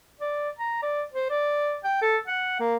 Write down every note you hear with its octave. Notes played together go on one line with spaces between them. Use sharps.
D5
A#5
D5
C5
D5
G5
A4
F#5
A#3